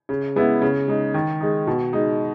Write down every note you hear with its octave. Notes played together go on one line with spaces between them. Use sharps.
C#3
G#3 B3 E4
C#3
G#3 D#4
D#3
G#3 D#4
B2
G#3 D#4